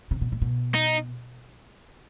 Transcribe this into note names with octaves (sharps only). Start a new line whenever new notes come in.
C3
B2
A#2
B2
D#4